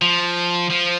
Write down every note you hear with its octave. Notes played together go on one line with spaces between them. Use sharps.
F3
F3